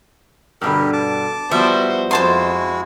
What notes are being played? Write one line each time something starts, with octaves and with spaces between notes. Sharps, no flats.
G2 B2 D3 G4 A#4
A5 D6
F3 G3 B3 F#4 C5 E5
F2 G#3 E4 F#4 C5 A5 C6